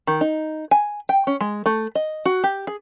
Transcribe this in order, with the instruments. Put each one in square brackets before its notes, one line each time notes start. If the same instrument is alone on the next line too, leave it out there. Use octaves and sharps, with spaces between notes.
[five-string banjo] D#3
D#4
G#5
G5
C#4
G#3
A3
D#5
F#4
G4
G#4